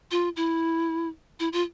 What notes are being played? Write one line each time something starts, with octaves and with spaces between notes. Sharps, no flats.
F4
E4
E4
F4